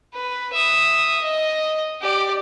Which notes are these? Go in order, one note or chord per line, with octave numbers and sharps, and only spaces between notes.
B4
E5 D#6
D#5
G4 D5